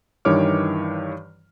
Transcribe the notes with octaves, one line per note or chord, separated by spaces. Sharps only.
G2 D#3 E3 C#5 D6 F6